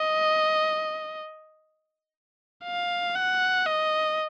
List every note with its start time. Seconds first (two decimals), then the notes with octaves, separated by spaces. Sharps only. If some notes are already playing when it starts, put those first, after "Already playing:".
Already playing: D#5
2.64 F5
3.15 F#5
3.66 D#5